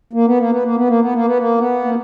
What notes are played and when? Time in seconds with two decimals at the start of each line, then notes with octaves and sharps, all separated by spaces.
0.13 A#3
0.26 B3
0.38 A#3
0.51 B3
0.63 A#3
0.76 B3
0.88 A#3
1.01 B3
1.14 A#3
1.26 B3
1.38 A#3
1.58 B3
1.84 A#3